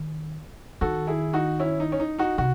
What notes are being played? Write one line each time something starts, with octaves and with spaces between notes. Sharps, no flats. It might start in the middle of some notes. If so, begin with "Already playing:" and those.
Already playing: D#3
D#3 F#4 A4
E4 G#4
D#4 F#4
C#4 E4
D#4
C#4
D#4
D#4 F#4
C3 F#4